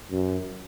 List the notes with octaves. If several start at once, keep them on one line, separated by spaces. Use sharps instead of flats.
F#2